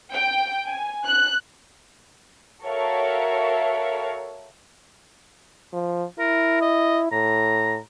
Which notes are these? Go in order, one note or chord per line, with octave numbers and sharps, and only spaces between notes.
G5
G#5
F#6
F#4 A4 A#4 C#5 E5 F5
F3
E4 A#4
D#5
A2 A#5